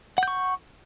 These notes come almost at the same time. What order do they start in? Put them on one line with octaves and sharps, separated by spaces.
F#5 G6 C#6